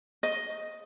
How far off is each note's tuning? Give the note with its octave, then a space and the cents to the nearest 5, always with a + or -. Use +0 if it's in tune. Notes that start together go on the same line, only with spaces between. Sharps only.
D#5 +5